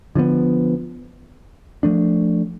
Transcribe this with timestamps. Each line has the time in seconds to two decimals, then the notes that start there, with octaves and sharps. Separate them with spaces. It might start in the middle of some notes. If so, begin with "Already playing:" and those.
0.15 D3 F3 G#3 B3
1.83 F3 A3 D4